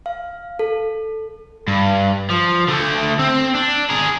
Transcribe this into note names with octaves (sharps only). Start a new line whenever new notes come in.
F5
A4
G2
F3
D3 A3
C4
D4
G#4 A#4